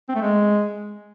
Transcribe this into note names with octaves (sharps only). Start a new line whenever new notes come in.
C4
A3
G#3